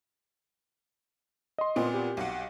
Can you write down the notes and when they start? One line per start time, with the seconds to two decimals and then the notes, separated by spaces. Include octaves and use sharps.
1.58 D#5 C6
1.76 A#2 B3 C4
1.94 G4
2.17 B1 F#5